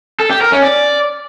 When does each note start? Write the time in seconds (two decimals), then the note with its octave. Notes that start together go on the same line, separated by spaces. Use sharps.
0.20 A4
0.30 G4
0.41 A#4
0.52 C#4
0.62 D5